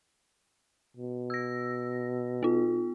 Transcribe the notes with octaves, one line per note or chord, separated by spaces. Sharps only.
B2
E6 A#6
B3 F4